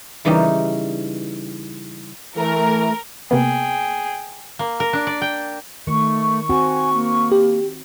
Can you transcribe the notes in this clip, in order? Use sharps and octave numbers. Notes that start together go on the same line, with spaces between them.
C#3 E3 G3 D#4 G4
E3 A3 A#4
C3 A#3 B3 G#4 G5
A#3
A#4
D4
D5
G5
D#3 A3 C#6
C4 F#4 G#5
A#3
G4